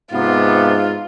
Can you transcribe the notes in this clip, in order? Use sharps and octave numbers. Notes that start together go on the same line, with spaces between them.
G#2 C3 B3 F4